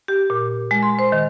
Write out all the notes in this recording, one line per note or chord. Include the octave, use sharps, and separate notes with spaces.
G4
A#2
G#3
C6
C5
D#3